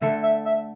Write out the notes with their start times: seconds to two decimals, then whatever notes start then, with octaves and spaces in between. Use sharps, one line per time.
0.02 D3 A3 D4 A4 E5
0.23 E5
0.46 E5